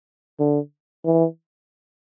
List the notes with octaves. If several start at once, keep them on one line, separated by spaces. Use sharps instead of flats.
D3
E3